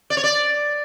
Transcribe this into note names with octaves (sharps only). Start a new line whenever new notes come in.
D5
C#5
D5